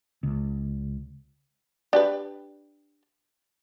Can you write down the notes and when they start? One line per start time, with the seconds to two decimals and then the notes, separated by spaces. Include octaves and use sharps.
0.23 C#2
1.93 D4 G4 B4